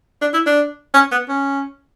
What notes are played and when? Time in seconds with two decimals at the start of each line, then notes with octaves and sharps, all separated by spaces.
0.22 D4
0.33 E4
0.46 D4
0.94 C#4
1.11 B3
1.29 C#4